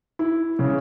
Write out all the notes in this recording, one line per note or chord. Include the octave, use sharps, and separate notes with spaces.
E4
C#3